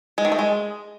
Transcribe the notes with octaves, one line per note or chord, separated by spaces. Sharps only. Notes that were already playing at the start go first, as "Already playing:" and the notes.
G#3
D#3
A3
G#3